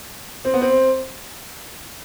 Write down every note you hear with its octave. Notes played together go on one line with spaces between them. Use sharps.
C4
B3
C4